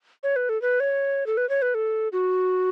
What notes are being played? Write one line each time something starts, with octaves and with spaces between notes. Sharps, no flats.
C#5
B4
A4
B4
C#5
A4
B4
C#5
B4
A4
F#4